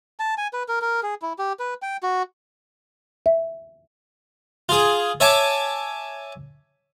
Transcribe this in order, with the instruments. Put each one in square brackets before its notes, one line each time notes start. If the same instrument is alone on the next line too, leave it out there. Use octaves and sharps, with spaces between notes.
[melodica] A5
G#5
B4
A#4
A#4
G#4
E4
G4
B4
G5
F#4
[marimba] E5
[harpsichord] F4 G#4
C#5 E5 G#5 A5 D6